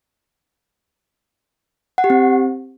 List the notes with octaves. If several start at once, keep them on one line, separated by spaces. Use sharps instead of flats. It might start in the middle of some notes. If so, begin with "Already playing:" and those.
F#5
G4
C4